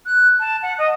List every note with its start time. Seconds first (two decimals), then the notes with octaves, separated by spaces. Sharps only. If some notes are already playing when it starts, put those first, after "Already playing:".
0.06 F#6
0.40 A5
0.62 F#5
0.78 D#5